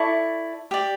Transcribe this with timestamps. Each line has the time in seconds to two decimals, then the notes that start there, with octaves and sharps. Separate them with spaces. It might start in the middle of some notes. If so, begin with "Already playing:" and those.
Already playing: E4 A4 D5 C#6
0.71 G4 D5